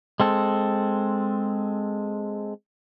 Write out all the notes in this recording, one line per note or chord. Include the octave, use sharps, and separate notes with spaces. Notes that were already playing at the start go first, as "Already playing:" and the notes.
G#3 C4 A4